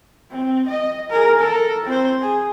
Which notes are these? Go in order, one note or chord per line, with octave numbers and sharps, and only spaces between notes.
C4
D#5
G#4 A#4
A4 A#4
C4 C5
G#4